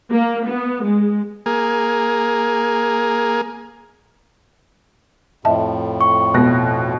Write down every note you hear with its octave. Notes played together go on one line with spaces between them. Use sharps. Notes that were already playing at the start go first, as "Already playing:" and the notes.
A#3
B3
G#3
A#3 G#4
F2 A2 D#5 E5 A5
C#6
B2 F#6 A#6